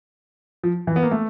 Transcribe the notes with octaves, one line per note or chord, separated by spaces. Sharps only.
F3
E3
B3
A#3
A3